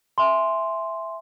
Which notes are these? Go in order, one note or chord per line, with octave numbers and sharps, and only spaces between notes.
E5 G#5 C6